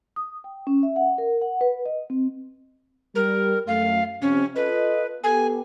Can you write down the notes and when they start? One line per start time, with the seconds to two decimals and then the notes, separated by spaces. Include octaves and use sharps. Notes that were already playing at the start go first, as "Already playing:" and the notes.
0.16 D#6
0.44 G5
0.67 C#4
0.83 E5
0.96 F#5
1.18 A#4
1.42 F#5
1.61 B4
1.86 D#5
2.10 C4
3.15 G3 A#4
3.68 F#2 A3 F5
4.22 F2 C3 C#4
4.56 F4 A4 B4 D#5
5.24 B3 G4 A4 G#5